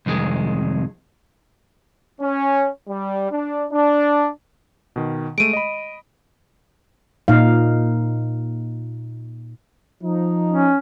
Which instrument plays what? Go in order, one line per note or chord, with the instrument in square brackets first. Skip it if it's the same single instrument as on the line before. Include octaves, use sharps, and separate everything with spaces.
[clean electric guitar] C2 F2 D#3 G#3
[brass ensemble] C#4
G3
D4
D4
[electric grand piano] B2 D#3
[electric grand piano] G#3 A3 [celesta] D7 D#7
[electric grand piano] D#5 B5
[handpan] A#2 D#4 F5
[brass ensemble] F3 D#4
[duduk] C#4